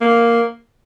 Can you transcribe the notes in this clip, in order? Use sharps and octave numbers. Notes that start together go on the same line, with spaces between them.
A#3